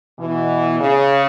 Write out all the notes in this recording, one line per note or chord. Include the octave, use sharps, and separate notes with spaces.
B2 E3
C#3